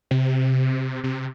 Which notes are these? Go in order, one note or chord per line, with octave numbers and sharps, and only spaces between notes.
C3
C3